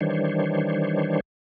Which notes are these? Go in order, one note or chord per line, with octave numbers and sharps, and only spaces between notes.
D#3 E3 G3 D4 C5 C#5